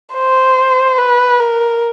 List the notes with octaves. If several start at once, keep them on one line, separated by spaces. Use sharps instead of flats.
C5
B4
A#4